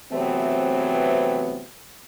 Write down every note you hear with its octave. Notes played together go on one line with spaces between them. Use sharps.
C3 E3 F#3 A3 B3 C4